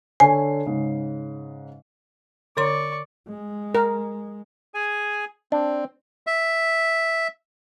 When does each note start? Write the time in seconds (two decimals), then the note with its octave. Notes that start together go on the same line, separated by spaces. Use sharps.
0.20 D3 C#5 G#5 C7
0.66 G#2 C#3
2.57 D3 C#5 D5 C6 C#6
3.28 G#3
3.75 A#4
4.74 G#4 G#5
5.52 C4 D4
6.27 E5